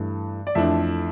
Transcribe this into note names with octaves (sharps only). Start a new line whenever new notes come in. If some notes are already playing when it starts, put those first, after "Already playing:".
Already playing: G2 E3 A3 E4
D5
F2 E3 A3 D4 E5